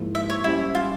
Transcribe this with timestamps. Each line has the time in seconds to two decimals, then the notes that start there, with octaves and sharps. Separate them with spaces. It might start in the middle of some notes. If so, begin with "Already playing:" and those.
Already playing: G#2 F3 A#3 E4
0.15 E5
0.30 C#5
0.44 G3 C#4 E4 G4 C5
0.75 F4